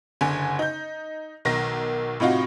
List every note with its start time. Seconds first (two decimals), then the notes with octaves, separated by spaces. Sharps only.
0.21 F#1 D3 G#5
0.59 D#4 G6
1.45 B1 D#3 A#4 A#6
2.20 A2 C3 D#4 F4 F#4